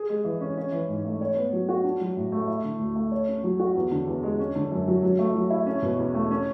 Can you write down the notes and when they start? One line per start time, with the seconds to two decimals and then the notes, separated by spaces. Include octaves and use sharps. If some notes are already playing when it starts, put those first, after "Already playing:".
Already playing: G#4
0.09 G#3
0.24 E3
0.41 C#4
0.57 C#4
0.72 E3
0.88 G#2
1.05 A3
1.21 C#5
1.36 B3
1.53 F#3
1.69 F#4
1.84 D4
2.01 F#3
2.17 A2
2.32 A3
2.48 E4
2.64 D3
2.79 D2
2.96 A3
3.12 C#5
3.28 C#4
3.43 F#3
3.59 F#4
3.75 E2
3.91 D3
4.07 E2
4.23 G#3
4.39 C#4
4.55 D3
4.72 F#2
4.88 F#3
5.03 F#3
5.19 A3
5.34 F#3
5.50 E4
5.66 C#4
5.82 B2
5.98 E2
6.14 A3
6.31 C#4